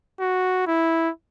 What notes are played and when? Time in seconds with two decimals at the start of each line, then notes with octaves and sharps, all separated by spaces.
0.20 F#4
0.67 E4